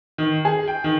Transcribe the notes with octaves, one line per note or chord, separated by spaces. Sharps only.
D#3
G#4
G5
D#3